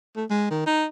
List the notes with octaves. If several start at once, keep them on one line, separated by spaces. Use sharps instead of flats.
A3
G#3
D#3
D#4